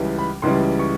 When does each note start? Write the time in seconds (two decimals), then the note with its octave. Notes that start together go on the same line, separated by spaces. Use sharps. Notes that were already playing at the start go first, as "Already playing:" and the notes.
Already playing: C#2 C#3 E3 G3
0.18 B5
0.42 C#2 C#3 E3 G3 C6
0.79 C#6